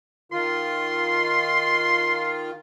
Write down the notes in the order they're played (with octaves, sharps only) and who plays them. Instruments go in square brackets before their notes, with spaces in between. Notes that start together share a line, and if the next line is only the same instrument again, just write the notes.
[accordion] D#3 F4 [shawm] C6